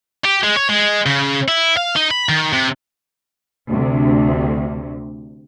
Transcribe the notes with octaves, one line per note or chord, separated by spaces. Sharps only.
G4
G#3
C#5
G#3
C#3
E4
F5
D#4
B5
D#3
C3
D2 C3